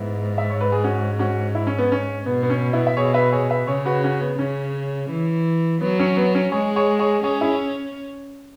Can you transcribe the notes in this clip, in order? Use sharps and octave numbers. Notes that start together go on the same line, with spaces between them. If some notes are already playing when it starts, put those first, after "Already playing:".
Already playing: G#2 B3 E4
E5
C#5
B4
G#4
C#4 F#4
C#4 F#4
E4
C#4
B3
C#4
B2 B3
B3
C#4
B3 E4
E5
B2 G#4 C#5
B4 E5
G#4 C#5
B4 E5
C#3 G#4 C#5
F#4 B4
C#4 F#4
B3
C#3 C#4
E3
F#3 B3
C#4
B3
C#4
G#3 G#4 C#5
G#4 C#5
G#4 C#5
C#4 G#4 C#5
E4 G#4